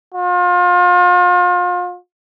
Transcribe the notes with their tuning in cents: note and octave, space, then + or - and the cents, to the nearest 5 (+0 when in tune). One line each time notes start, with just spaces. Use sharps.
F4 +35